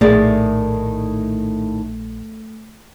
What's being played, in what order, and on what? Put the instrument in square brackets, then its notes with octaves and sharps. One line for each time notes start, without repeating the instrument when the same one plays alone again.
[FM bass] A#1 [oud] A2 D#3 E4 [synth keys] A3 [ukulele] G#4 D5